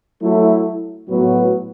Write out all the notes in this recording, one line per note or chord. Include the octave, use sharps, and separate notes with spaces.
F#3 A3 E4
A2 F#3 B3 F#4 B4